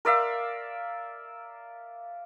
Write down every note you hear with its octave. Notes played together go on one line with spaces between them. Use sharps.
A#4 D5 E5 F5